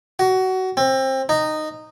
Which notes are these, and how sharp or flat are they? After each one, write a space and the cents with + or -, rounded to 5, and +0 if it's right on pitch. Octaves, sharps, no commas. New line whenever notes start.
F#4 +20
C4 +25
D#4 -10